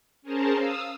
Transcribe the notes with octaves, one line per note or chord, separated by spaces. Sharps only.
C#4 G#4 A#4 C5 A5 A#5
F5 D#6 E6